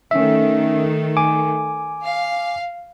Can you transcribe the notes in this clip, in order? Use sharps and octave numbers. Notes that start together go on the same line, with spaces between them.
D#3 A3 C#4 E5
G#5 D6
F5